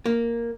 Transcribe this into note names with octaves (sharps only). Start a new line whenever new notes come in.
A#3